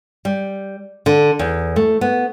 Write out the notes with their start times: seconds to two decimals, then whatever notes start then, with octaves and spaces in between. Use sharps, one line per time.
0.25 G3
1.06 D3
1.39 E2
1.76 A3
2.01 B3